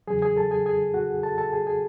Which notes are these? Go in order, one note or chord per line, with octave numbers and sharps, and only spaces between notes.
E2 C#3 F#3 G#4 G#5
G#4 G#5
A4 A5
G#4 G#5
G#4 G#5
F#4 F#5
A4 A5
A4 A5
G#4 G#5
G#4 G#5